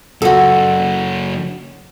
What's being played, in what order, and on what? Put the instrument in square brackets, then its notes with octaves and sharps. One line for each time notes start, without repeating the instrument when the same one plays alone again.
[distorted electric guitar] F#2 C#3 [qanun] F#4 A4